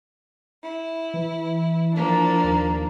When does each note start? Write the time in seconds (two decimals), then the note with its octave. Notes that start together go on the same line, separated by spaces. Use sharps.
0.62 E4
1.14 E3
1.94 F3 A#3 D4
2.44 D#2